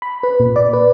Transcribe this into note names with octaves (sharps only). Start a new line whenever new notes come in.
B5
B4
A#2
D5
B4